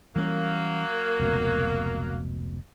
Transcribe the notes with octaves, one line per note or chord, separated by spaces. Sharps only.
E3 F#3 G3 A#3 C#4
F1 C#2 B2